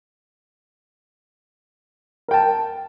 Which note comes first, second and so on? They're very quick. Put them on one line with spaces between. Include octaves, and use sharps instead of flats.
A#4 G5 A5